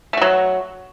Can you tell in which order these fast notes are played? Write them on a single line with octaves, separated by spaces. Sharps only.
A3 F#4 F#3